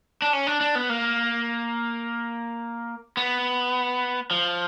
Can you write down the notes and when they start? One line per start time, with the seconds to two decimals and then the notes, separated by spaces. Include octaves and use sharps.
0.22 D4
0.33 C#4
0.47 D4
0.61 D4
0.75 B3
0.90 A#3
3.17 B3
4.31 F3